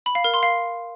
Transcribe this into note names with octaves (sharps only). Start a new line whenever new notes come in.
B5
F5
A#4
C6
F5